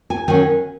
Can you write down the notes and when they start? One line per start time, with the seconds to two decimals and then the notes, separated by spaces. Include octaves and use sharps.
0.10 G#5
0.28 D#3 F#3 C#4 G#5